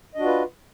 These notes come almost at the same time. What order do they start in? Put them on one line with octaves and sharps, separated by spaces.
D#5 D4 F#4 F4 B4